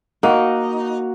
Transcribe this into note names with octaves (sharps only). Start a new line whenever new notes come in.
A#3 D#4 F#4